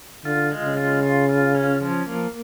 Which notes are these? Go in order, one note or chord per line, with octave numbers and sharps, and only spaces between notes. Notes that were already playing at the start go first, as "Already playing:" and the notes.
D3 F4
G#3
C#3
F4
F4
F4
C#4
F3
A#3